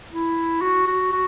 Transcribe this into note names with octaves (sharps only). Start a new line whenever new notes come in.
E4
F#4
F#4
F#4